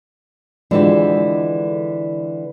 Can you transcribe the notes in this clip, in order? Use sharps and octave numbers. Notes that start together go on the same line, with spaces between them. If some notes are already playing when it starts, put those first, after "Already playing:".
D3 E3 F3 G#3 G4